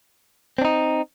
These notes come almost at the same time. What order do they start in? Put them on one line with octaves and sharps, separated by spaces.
C4 D4 D#4